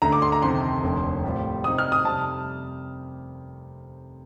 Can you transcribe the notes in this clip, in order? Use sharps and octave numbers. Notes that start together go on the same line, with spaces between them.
D2 D3 A3 A#5
D6
C6
A#5
F2 C3 D#3 C6
F1 D#2 D3
A2 G3 C4 F4
C3 G3 C4 D#4 D#6
F6
D#6
F2 C3 G3 A5